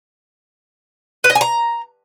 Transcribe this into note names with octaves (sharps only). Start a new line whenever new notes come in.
B4
D#5
G#5
A#5